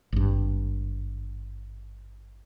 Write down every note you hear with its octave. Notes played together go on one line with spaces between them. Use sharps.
G#1 G2